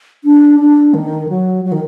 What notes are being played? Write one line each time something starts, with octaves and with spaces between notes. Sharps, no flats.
D4
D4
D#3
F#3
F#3
D#3